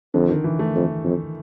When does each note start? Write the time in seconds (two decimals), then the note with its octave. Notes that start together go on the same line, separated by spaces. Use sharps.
0.14 F2 D3
0.29 D#3
0.44 E3
0.59 A3
0.75 F2
1.04 F2